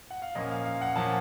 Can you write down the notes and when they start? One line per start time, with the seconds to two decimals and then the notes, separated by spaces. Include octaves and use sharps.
0.11 F#5
0.22 F5
0.35 A#2 F3 A#3 C#4 D#5
0.51 F5
0.65 F5
0.82 F#5
0.96 A#2 F3 A#3 C#4 A5